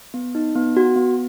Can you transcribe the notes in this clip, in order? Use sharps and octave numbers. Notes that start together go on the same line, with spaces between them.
B3
D#4
B3
F#4
B3